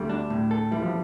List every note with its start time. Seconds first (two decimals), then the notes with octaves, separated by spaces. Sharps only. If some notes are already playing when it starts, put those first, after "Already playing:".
Already playing: D2 D3 G3
0.09 D4
0.30 A2
0.51 A4
0.71 E3 G3
0.82 F3